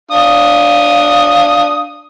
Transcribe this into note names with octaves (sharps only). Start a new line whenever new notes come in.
D4 F5 D#6